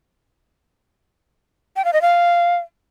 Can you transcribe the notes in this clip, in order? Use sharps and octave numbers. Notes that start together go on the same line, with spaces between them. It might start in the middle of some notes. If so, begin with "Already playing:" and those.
G5
F5
D#5
F5